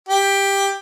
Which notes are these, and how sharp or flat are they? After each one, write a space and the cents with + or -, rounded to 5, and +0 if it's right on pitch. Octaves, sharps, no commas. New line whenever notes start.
G4 +10